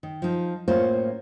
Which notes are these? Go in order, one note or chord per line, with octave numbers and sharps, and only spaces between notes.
D#3
F3 D#4
A2 A#3 C#4 F4 C5 C#5